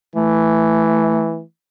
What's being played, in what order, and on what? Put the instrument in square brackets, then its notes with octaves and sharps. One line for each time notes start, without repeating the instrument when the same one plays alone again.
[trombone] E3 [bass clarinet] A3